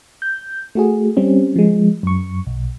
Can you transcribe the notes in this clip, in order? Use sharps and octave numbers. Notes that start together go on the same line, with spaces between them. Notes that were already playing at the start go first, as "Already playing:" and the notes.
G6
A3 F#4 G#4
G3 C4 C#4
F3 G#3
F#2 C#6
B1